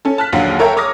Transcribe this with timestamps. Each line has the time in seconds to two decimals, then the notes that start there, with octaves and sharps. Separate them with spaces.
0.05 C#4 A4
0.18 A5 F6 F#6 B6
0.32 A#1 D#2 D3 F#3 F5 F#5
0.59 A4 A#4 C#5 E5 G5 A#5
0.77 C#5 D6 D#6 F6 A#6